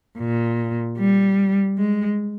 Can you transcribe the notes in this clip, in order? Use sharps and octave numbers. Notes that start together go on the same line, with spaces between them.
A#2
G3
G#3